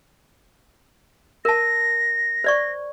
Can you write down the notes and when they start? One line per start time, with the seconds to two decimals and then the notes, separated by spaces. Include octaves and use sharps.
1.45 A#4 A5 A#6
2.44 C5 D5 C#6